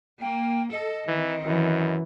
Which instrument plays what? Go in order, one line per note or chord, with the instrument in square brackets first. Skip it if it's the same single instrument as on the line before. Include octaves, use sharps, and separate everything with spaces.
[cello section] A#3 [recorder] G5
[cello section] A4 [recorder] D#5
[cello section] D#3 C4 [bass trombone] E3
[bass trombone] F#2 [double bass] E3